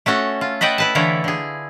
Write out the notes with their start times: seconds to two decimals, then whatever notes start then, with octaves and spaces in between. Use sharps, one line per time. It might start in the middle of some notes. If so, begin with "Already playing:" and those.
0.06 A3 C#4 F#4 A4
0.41 F4
0.61 B4 D#5 E5 F#5 G5 A5
0.78 E4 B4 A5
0.95 D3 E3 E4 F4 C#5
1.24 D3 G#4